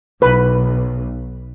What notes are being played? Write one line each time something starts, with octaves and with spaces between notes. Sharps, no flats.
B1 B4